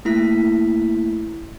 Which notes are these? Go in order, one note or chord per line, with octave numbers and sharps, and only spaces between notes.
A3 A#3 E4 B6